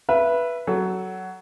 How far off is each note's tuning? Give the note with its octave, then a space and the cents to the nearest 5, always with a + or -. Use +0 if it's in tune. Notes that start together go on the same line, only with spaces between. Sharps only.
B4 -10 E5 +20
F#3 +15 A4 +0